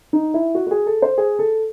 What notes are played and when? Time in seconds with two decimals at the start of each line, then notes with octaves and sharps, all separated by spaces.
0.13 D#4
0.34 E4
0.55 F#4
0.67 F#4
0.71 G#4
0.86 A4
1.02 C5
1.18 G#4
1.39 A4